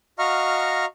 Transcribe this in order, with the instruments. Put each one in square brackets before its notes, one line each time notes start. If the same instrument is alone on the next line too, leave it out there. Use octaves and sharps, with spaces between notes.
[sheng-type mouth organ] F#4 D#5 F5 A#5 C#6 F6